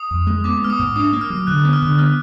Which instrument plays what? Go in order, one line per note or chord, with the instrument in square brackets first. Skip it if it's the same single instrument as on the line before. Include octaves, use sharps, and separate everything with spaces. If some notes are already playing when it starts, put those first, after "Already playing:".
Already playing: [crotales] D#6
[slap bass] F2
G#3
[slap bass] B3 [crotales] D6
[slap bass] B3 [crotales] F6
[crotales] D#6
[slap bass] G#2
[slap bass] D4 [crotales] D#6
[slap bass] A#3
[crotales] F6
[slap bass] F#3
[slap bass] D3 [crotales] F#6
[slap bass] B3
[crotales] F6
[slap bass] D3
[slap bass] B3 [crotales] F6